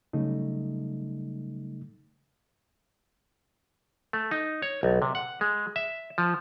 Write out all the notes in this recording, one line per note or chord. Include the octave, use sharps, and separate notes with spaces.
C#3 F#3 G3 A3 D#4
A3
D#4
C#5
B1
C3
F#5
G#3
E5
F3